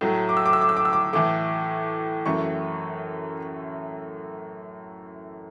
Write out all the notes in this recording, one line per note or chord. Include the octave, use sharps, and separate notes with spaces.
A2 F#3 A3
D6
E6
D6
E6
D6
E6
D6
E6
D6
A2 E3 A3 D6
F#2 E3 A3 C#6